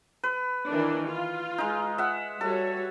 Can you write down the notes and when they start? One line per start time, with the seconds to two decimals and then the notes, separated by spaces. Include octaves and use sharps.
0.24 B4
0.69 D#3 E3 D4
1.09 F4
1.58 G#3 D#4
1.98 E5 F#5
2.41 G3 F#4 A4 C#5